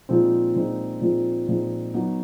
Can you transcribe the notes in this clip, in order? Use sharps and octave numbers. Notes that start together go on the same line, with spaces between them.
A#2 F3 G#3 C4 D#4
A#2 F3 G#3 C4 D#4
A#2 F3 G#3 C4 D#4
A#2 F3 G#3 C4 D#4
F#3 B3 D#4